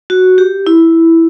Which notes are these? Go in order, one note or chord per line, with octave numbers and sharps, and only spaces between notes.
F#4
G4
E4